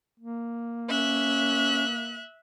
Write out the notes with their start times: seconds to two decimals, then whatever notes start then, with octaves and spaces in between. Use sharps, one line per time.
0.20 A#3
0.89 C#4 E5 F#6